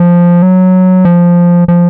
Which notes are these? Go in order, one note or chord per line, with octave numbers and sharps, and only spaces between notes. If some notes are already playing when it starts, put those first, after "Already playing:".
Already playing: F3
F#3
F3
F3